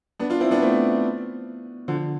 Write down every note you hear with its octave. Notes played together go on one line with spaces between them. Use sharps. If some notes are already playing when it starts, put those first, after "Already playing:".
B3 D4
D4 F4
C4 E4
B3 D4
A3 C4
D3 F3